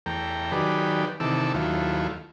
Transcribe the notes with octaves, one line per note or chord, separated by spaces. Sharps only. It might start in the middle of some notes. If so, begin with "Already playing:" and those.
E2 A3 G5 A#5
D#3 F#3 G4 G#4 B4 D5
C3 D#3 E3 A4 D6 E6
D#2 F#3 A3 E4 F4